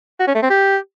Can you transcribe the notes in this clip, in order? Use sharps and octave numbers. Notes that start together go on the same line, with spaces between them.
F#4
C#4
A3
C4
G4